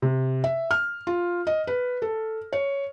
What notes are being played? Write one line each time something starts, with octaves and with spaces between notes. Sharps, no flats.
C3
E5
F6
F4
D#5
B4
A4
C#5